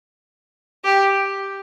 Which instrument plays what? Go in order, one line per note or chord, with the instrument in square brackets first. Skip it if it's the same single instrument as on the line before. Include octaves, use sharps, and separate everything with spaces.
[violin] G4